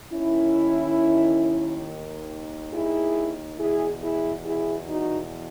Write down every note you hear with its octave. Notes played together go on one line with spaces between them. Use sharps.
D#2 D#3 C#4 E4
E4 G#4
E2 B2 E4 G#4
E4 G#4
E4 G#4
D#4 F#4